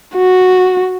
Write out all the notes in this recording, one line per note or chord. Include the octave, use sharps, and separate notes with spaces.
F#4